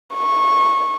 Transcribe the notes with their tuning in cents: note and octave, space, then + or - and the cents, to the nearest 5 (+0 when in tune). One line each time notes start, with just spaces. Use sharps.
C#6 -15